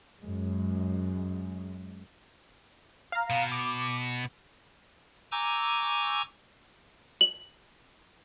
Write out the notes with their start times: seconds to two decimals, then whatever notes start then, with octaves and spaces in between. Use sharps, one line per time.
0.19 F#2 G#3
3.12 F5 A#5
3.30 B2
3.52 D6
5.32 G#5 A#5 C#6 D6 E6 G6
7.21 F#7